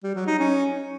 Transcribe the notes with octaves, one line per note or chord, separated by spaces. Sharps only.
G3
F#3
D#4
C#4